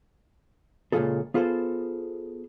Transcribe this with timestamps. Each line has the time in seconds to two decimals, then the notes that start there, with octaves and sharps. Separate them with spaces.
0.92 C#2 A#2 E3 F4 G#4 A4
1.34 B3 F4 G#4 A4 C5